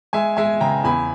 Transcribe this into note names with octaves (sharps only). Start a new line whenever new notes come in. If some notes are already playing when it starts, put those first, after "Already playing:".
G#3 E5 G#5
G#3 E5 G#5
C#3 G5 A#5
E2 G#5 B5